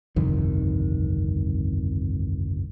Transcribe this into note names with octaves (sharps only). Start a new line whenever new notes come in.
G1 C2 F2 D#3